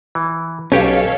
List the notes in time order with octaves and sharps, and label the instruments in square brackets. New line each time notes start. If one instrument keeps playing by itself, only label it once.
[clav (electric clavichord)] E3
[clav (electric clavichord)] B1 G4 [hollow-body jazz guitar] C#4 [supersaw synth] A4 C#5 F5